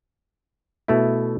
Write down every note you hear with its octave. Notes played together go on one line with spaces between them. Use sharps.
B2 A3 E4